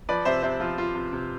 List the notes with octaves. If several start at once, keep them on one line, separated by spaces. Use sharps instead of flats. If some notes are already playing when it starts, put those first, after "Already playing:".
F3 B4 D5
C3 C5 E5
C3 C5 E5
F3 F4
F3 F4
C3
C3